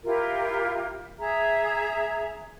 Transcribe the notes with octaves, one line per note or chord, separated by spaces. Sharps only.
E4 F4 G4 A#4
G#4 E5 A#5